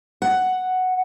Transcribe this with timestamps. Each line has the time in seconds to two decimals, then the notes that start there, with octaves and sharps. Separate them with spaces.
0.22 F#5